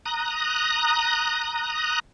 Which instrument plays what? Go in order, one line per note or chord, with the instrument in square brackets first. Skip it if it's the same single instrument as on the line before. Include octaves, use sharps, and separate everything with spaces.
[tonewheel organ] A#5 D#6 F#6